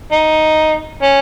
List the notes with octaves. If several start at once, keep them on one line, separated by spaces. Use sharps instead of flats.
D#4
C#4